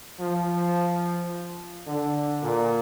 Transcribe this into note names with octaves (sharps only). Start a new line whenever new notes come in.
F3
D3
A#2